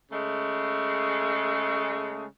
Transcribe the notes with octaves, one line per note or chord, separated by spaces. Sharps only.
C#3 G#3 A3